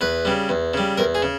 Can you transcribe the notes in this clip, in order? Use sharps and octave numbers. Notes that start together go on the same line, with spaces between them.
E2 B4
C#3 G3
E2
C#3 G3
E2 A#4
G#4
C#3